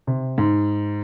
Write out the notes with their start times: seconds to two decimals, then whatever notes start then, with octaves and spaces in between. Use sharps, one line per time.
0.07 C3
0.38 G#2